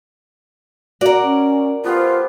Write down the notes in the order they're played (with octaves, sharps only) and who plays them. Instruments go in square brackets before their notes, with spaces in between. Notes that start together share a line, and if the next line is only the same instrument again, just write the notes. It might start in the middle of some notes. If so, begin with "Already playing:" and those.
[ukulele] F#4 F#5 [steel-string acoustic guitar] A#4 D5
[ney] C#4
[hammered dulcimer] F3 B3 G4 [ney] F4